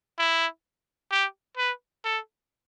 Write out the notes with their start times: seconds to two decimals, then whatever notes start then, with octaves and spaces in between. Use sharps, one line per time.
0.19 E4
1.11 G4
1.57 B4
2.04 A4